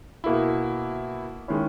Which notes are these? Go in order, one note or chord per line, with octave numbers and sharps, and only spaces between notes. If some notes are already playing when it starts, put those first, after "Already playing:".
B2 A#3 E4
D#3 G#3 C#4 E4